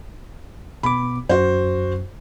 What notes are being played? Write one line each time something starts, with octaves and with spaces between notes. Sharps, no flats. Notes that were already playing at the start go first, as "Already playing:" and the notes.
B2 B3 B5 D6
F#2 F#4 C5